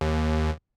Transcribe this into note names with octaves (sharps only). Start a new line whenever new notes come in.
D#2